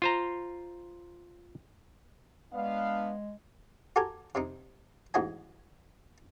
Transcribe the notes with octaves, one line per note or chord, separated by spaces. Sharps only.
F4 C5 A#5
G#3 B3 D4 F5
F#4 G4 A4 A#4 G#5
C3 C4 D#4
A1 G#2 F#4 D#5 G#5